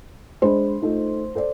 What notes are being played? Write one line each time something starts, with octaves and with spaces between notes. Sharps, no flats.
G#3 D4 C5 B5
A3 D#4 F4
A4 C5 D5